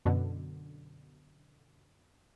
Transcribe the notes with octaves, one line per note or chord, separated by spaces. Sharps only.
F#2 B2 D3